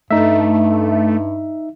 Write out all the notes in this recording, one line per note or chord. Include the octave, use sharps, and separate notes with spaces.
G2 A3 D#4 E5